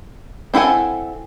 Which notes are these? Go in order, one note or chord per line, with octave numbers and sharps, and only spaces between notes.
C4 E4 A4 F#5 G#5